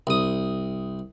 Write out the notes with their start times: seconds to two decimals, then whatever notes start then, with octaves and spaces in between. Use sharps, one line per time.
0.07 C2 D#6